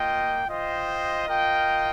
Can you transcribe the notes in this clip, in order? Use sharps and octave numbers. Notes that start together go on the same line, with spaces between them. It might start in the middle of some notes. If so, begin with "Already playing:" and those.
Already playing: A#3 F4 D#5 G5
F4 C5 D#5 G5
F4 A#4 D#5 G5